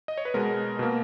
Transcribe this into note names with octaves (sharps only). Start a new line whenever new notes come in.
D#5
C#5
B4
B2 G#3 B3 A#4
B2 A#3